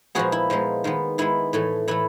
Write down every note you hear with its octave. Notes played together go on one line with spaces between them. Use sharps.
A#2 F3 G#3 B3 F#4 G#4
E4
A#2 F3 G#3 B3
D#3 G#3 B3
D#3 G#3 B3 E4
A2 E3 A3
A2 E3 A3 E4